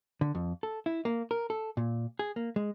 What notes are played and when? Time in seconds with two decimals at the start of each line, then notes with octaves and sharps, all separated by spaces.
0.21 D3
0.35 F2
0.63 A4
0.86 E4
1.05 A#3
1.31 A#4
1.50 A4
1.77 A#2
2.19 G#4
2.36 A#3
2.56 G#3